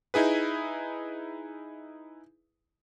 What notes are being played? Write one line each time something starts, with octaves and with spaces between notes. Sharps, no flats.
D#4 E4 G#4 B4